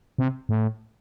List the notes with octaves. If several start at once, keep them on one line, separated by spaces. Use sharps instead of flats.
C3
A2